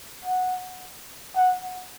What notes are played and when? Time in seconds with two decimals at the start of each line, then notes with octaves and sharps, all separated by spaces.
0.25 F#5
1.36 F#5